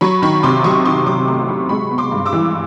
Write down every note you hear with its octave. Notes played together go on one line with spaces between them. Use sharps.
F#3 B5 C#6
D#3 B5 C#6
C3 C6 D6
F#3 C#6 D#6
D#3 C6 D6
F#3 C6 D6
A3 C6 D6
C6
F#3 B5 C#6
G#3 B5 C#6
B3
C6 D6
G2
D6 E6
E3